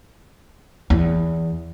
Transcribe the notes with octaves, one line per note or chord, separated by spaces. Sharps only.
E2